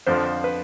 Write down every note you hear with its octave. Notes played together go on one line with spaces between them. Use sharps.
F2 D3 F3 C5
B4